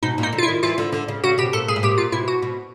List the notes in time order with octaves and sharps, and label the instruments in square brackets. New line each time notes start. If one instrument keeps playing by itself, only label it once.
[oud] B2 [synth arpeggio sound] D#4
[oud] A#2
[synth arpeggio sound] D#4
[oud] D3
[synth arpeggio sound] F4
E4
[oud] D#3
[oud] E3 [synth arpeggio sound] F4
[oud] D3
D3
C#3
[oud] C#3 [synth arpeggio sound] F#4
[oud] B2 [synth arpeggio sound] G4
[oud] A#2 [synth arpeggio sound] A4
[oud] A#2 [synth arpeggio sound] G#4
[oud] A2
[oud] A#2 [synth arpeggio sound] G4
[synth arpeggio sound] F4
[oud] B2 [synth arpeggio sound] E4
[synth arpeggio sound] F#4
[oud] B2